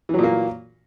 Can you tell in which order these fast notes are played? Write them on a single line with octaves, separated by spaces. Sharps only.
E3 F#3 A#2 A#3